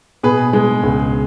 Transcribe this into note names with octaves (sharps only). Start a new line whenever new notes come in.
B2 G#4 B4
G#3
C#2